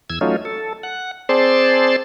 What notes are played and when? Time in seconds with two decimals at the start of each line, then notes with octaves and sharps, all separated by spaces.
0.10 E2 E6 G#6
0.21 F#3 A3 C#4 D#4 F4
0.45 A4
0.83 F#5
1.29 C4 G#4 C5 D5 A5 C6